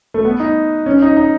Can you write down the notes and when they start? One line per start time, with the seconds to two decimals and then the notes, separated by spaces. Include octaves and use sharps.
0.14 A3
0.25 B3
0.40 D#4
0.86 C#4
1.02 D#4
1.17 D#4